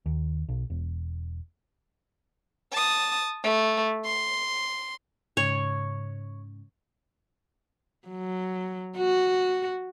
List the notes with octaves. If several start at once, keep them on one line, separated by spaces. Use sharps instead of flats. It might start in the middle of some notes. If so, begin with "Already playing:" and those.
D#2
B1
E1
A5 D#6
A3
C6
G#2 C#3 C#5
F#3
F#4